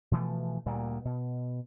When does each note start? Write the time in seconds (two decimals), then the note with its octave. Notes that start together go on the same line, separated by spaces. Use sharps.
0.11 B2 E3 F3 A3
0.66 D2 A#2 G3 A#3
1.05 B2